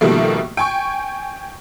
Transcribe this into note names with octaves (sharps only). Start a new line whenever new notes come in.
B2 D#3 F3 G3 A3 A#3
G5 G#5 C#6